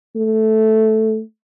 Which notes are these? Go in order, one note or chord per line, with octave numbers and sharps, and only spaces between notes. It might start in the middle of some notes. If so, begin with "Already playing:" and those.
A3